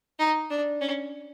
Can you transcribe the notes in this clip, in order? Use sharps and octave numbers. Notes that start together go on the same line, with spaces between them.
D#4
D4
C#4